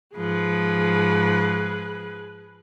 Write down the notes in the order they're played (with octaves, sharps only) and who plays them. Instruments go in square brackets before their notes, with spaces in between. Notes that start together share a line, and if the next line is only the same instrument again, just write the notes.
[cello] G#2 F3 [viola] G#4 B4